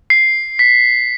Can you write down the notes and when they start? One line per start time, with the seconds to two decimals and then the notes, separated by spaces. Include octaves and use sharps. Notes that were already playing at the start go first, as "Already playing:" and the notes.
0.10 C7
0.59 B6